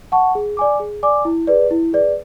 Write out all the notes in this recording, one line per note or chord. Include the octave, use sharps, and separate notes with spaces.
F#5 A5 C#6
G#4
D5 G#5 D6
G#4
D5 G#5 D6
E4
G#4 B4 D5
E4
G#4 B4 D5